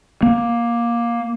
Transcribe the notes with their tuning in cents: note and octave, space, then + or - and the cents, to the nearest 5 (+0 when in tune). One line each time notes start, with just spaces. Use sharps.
A#3 +15